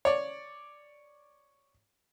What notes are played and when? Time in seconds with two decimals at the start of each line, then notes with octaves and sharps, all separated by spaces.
0.05 C#5 D5